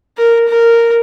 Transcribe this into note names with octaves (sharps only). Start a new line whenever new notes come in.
A#4
A#4